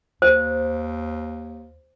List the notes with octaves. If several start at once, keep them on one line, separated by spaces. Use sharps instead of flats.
D#2 C5